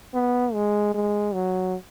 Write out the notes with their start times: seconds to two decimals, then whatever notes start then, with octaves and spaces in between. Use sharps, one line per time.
0.14 B3
0.54 G#3
0.94 G#3
1.34 F#3